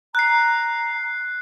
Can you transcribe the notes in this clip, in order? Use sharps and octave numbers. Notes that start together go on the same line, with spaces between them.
A#5 F#6 C7